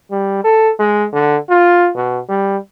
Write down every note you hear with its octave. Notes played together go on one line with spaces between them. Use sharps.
G3
A4
G#3
D3
F4
B2
G3